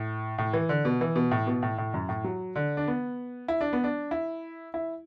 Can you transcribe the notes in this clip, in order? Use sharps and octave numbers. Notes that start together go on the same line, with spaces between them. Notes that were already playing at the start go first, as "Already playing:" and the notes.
Already playing: A2
A2
E3
D3
B2
E3
B2
A2
B2
A2
A2
F#2
A2
F#3
D3
D4
B3
E4
D4
B3
D4
E4
E4